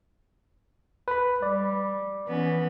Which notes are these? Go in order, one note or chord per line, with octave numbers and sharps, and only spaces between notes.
B4 B5
G3 D5
E3 B3 C#4